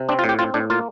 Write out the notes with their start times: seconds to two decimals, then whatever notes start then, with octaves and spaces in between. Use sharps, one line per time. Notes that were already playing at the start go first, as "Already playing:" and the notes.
Already playing: C3
0.09 C4 D4
0.19 F4
0.24 A2
0.29 G4
0.39 C4 F4
0.54 A2 D4
0.70 A#3 F4